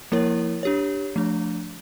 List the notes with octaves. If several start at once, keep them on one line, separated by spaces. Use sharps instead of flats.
F3 A#3 E4 A#4 C#5
D4 G4 C#5
F3 A3 D4